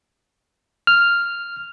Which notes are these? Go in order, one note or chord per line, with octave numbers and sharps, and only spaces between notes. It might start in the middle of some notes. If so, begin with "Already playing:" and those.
F6